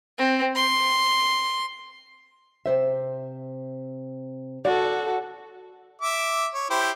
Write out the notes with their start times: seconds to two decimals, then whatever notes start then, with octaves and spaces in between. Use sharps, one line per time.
0.18 C4
0.55 C6
2.66 C3 C5 E5
4.65 F#4 A4 D5
6.02 E5 D6
6.54 C#5
6.70 E4 G4 C5